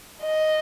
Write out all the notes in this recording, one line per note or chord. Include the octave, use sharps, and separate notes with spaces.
D#5